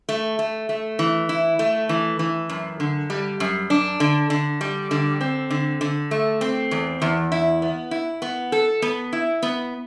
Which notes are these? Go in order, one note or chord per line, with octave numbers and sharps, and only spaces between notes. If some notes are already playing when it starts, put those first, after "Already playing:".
A3
A3
A3
E3
E4
A3
E3
E3
F#2
D3
G3
F#2
D4
D3
D3
G3
D3
C4
D3
D3
A3
C4
E2
E2
E4
B3
E4
B3
A4
B3
E4
B3